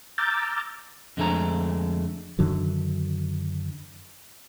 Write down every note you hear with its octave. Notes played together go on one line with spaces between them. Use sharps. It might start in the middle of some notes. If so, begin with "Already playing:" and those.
A#5 D6 E6 F6 G6 A6
F2 D3 G#3 A3 D4 A#5
F#2 D3 D#3 F#3